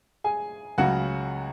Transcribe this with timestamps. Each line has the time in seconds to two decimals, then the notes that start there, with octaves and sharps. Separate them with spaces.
0.24 G#4 G#5
0.78 C#2 C#3 F#3 F#4 F#5